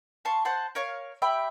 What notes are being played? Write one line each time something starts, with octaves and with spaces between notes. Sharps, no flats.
F5 A5 C6 C#6
C5 F#5 A5 C6
A#4 C#5 F5
G4 E5 G5 B5